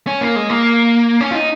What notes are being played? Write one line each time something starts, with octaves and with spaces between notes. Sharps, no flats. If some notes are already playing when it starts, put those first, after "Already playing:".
C#4
A#3
G#3
A#3
C#4
F4
D#4